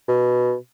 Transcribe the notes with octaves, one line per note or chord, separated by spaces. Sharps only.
B2